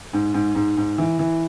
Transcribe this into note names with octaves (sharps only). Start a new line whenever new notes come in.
G#2
G#2
G#2
G#2
E3
E3